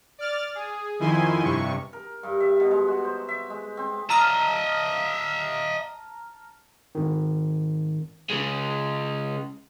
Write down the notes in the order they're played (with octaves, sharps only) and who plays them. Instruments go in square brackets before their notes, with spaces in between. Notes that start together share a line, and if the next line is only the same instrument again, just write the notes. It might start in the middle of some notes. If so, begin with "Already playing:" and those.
[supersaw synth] D5 F6 A6
G#4
F2 D#3 E4 G#5 C6
G2 C3 C#6
[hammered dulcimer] A#4
G2
E5
B2
G#3
F#4
C5
E5
G#3
C4
[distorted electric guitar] D#5 E5 [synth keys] A5 A#5 F6
[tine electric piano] G#1 D#3
[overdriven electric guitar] C#3 G#3